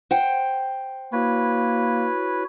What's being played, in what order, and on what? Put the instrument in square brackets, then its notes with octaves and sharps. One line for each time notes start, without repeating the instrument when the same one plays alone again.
[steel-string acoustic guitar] C5 F#5 G5
[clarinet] A#3 [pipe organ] E4 F#4 C#5 [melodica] B4